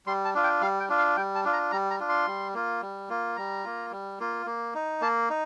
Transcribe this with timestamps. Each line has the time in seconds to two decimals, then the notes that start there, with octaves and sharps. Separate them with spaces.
0.06 G3 C6
0.25 A5
0.34 D4 F4
0.44 G5
0.61 G3 F5
0.80 G5
0.89 D4 F4
0.98 F5
1.17 G3 G5
1.35 A5
1.44 D4 F4
1.53 A#5
1.72 G3 A#5
1.91 A#5
2.00 D4 F4
2.09 C6
2.27 G3
2.54 A#3 F4
2.82 G3
3.10 A#3 F4
3.37 G3 A#5
3.64 A#3 F4
3.91 G3
4.20 A#3 F4
4.46 A#3
4.74 D#4
5.01 A#3 A5
5.30 D#4